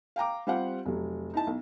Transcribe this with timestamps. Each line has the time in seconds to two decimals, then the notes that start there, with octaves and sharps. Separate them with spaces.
0.16 F5 G5 A#5 D6
0.47 G3 C4 F4 G4 F5 F#5
0.86 F1 F#3
1.34 D#4 E4 A5
1.47 B1